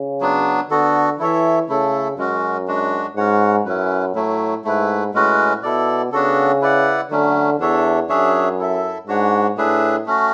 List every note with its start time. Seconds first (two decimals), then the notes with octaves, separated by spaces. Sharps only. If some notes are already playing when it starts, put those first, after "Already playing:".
Already playing: C#3
0.21 F#3 B3 D4
0.70 D3 B3 F#4 A4
1.19 E3 E4 A4 C#5 E5
1.69 C#3 A3 E4 A4
2.18 F#2 G#3 C#4 F#4
2.68 G#3 D4 F#4
3.16 G#2 C#4 F#4 C#5 F#5
3.66 F#2 C#4 E4 B4
4.15 A2 F#3 A3 E4
4.64 G#2 A3 E4 B4
5.13 A2 G#3 C#4 F#4 B4
5.63 B2 E4 A4 D5
6.12 C#3 B3 D4 F#4 A4
6.61 E4 B4 D5 F#5
7.11 D3 F#3 A3 C#4
7.60 E2 D4 A4 C#5 E5
8.09 F#2 D4 G#4 C#5 E5
8.59 E4 A4 E5
9.07 G#2 D4 F#4 C#5 F#5
9.57 A2 D4 G#4 B4 E5
10.06 A3 C#4 F#4